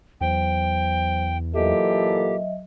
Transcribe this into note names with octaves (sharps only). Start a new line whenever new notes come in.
E2 F#3 C5 G5
A#2 E3 F#3 G4 A4 D#5 E5